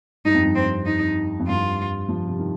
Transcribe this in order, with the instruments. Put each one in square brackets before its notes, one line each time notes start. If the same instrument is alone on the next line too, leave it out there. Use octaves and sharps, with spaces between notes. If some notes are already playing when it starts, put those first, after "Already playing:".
[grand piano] G2 [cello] D#4
[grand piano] F2
G2
[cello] C4
D#4
[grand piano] F2
[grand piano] G2 [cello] F4
[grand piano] F3
C3
D#3